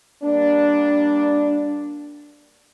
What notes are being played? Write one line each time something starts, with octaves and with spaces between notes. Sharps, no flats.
G3 A#3 D4